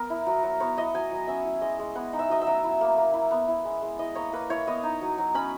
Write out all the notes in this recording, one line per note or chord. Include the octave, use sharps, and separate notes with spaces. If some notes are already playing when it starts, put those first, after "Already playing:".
Already playing: B3 A#4
E4
F#3
F#3
B3 C#5
E4 D#5
F#3 G#5
F#3
C#4 E5
E4
G#3 D#5
G#3
B3 F#5
D#4
E5
F#3 D#5
E5
F#3
E4
A#3
A#3
E4
B3
E4
G#3
G#3
E4 D#5
A#3 C#5
A#3 B4
E4 C#5
B3 D#5
D#4
F#3
F#3
C#4 B5